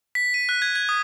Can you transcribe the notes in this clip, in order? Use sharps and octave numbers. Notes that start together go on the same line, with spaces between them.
B6
D#7
F#6
G#6
G#6
D#6